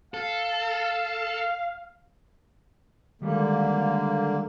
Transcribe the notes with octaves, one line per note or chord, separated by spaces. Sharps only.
A4 F5
D3 D#3 G3 G#3 A#3